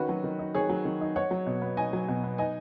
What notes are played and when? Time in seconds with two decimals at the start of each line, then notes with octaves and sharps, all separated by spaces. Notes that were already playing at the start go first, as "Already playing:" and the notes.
Already playing: D#3 C#4 F#4 B4
0.09 F#3
0.24 D#3
0.39 D#4
0.55 D#3 G#4 C#5
0.69 F#3
0.85 D#3
1.01 D#4
1.16 D#4 C#5 F#5
1.31 F#3
1.47 B2
1.62 B3
1.77 D#4 D#5 G#5
1.93 F#3
2.08 B2
2.24 B3
2.38 D#4 D#5 G#5